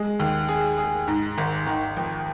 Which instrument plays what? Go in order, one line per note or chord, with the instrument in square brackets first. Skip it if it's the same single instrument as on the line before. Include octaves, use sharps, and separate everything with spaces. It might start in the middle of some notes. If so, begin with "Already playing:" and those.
Already playing: [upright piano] G#3
D#2
G#4
G#4
G#2
G#1
D#3
F2